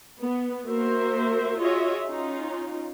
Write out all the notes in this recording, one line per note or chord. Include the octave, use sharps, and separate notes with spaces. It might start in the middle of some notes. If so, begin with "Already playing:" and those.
B3
A#3 F#4 A#4 C5 E5
F4 F#4 G#4 C#5 D#5 E5
C#4 D#4 F4